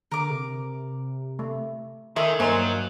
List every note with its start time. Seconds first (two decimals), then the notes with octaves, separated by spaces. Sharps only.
0.11 D3 A#4 D6
0.29 C3
1.39 A3
2.16 D#3 A4 A#4 D5 E5 G#5 C6
2.40 G2 F#3 A#3 D#4 C5 D5 F5 G#5